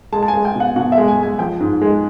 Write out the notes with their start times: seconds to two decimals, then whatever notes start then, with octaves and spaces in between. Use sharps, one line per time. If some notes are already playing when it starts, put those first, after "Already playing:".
0.12 G#3 A5
0.23 A5
0.28 G#5
0.34 G#3
0.45 G5
0.55 B2
0.60 F#5
0.76 B2 F#5
0.92 E5
0.98 G#3
1.08 G#5
1.19 G#3 G#5
1.39 F3 G5
1.60 G#2
1.81 G#3